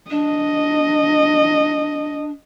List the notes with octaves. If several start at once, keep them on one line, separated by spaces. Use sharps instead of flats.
D4 D#5